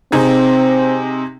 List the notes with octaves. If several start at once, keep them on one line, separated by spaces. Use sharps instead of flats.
C3 C4 D#4 G#4